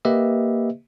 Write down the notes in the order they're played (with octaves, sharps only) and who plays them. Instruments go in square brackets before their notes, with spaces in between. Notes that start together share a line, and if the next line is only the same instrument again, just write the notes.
[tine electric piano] A#3 G4 B4 D#5 E5